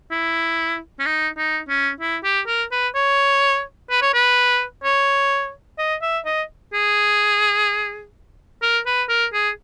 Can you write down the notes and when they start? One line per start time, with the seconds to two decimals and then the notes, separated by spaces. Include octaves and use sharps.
0.11 E4
1.00 C#4
1.06 D#4
1.38 D#4
1.69 C#4
2.01 E4
2.24 G4
2.47 A#4
2.72 B4
2.95 C#5
3.90 B4
4.02 C#5
4.14 B4
4.84 C#5
5.78 D#5
6.02 E5
6.25 D#5
6.74 G#4
8.62 A#4
8.86 B4
9.09 A#4
9.33 G#4